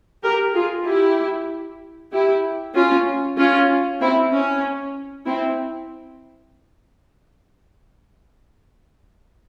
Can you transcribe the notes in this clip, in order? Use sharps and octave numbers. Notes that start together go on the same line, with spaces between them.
G4 A#4
F4 G#4
E4 G4
E4 G4
C#4 F4
C#4 F4
C4 E4
C#4
C4 E4